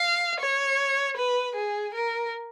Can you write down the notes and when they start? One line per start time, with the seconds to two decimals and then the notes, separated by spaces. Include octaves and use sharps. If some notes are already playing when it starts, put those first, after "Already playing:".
Already playing: F5
0.40 C#5
1.17 B4
1.56 G#4
1.94 A#4